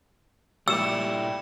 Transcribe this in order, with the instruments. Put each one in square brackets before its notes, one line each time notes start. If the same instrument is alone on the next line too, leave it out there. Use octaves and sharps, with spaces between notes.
[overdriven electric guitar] A#2 E4 [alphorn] G3 [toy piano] E6 [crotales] C#7 E7